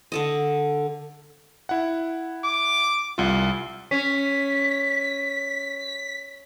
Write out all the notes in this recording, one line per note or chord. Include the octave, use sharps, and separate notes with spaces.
D3 A4 D#5
E4 F#5
D6
C2 F4
C#4 B6